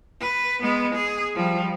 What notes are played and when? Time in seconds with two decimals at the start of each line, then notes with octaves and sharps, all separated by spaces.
0.21 B4
0.62 G#3 B3
0.95 G#4
1.35 F3 G3